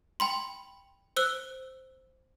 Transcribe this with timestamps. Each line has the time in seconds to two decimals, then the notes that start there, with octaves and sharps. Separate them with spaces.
0.20 G5 B5 C6
1.16 C5 E6 F#6 G7